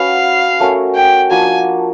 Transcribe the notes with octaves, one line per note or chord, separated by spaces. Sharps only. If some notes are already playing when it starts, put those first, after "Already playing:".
Already playing: C#4 F#4 B4 F5
A3 C#4 F#4 A#4
G5
F3 A#3 D4 F#4 G#5